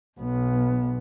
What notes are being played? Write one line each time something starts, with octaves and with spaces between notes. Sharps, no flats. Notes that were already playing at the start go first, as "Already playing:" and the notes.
B1 B3